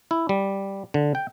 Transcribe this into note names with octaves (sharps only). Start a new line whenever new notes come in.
E4
G3
D3
G5